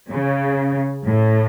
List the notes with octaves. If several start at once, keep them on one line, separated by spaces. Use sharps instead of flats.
C#3
A2